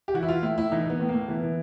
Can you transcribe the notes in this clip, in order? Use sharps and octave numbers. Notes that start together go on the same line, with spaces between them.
G4
E3 F#4
E4
E3 F4
A2 E4
A2 E4
E3 D#4
E3 B3
A2
A#3
A2
E3 B3
E3